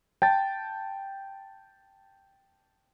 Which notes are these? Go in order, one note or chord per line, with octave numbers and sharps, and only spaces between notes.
G5 A5 A6